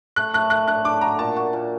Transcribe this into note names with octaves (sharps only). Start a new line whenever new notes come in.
A3 F#6
A3 F#6
A3 F#6
D4 F#6
D4 D6
F#4 A#5
A#2 A5
F#4
A#2